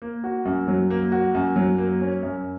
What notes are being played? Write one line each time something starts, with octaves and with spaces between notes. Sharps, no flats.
A#3
F#4
F#2
F#3
A#3
F#4
F#2
F#3
A#3
C#4
F#2